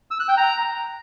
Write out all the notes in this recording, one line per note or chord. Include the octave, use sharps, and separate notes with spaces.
E6
F#6
G5
A#5